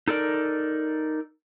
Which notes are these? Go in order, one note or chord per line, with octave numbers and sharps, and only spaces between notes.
D#4 A4 A#4 D5